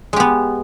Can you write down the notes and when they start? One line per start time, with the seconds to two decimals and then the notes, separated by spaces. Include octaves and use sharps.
0.13 G#3
0.16 G4
0.20 B3